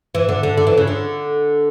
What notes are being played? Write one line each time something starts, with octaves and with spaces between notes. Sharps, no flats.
E3
D3
D3
D3
E3
C#3
D3